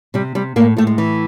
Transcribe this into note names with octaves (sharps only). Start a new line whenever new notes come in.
C3 G3
C3 G3
A2 A#3
A2 A3
G#3
E3